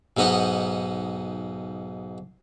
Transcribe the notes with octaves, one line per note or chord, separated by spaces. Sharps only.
B1 G#2 B3 D#4 D#5 F#5